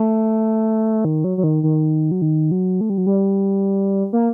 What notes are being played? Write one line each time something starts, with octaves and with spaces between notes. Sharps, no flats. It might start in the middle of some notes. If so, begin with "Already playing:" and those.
Already playing: A3
D#3
F#3
F#3
D#3
D#3
F#3
D#3
F#3
A3
G3
F#3
G3
A#3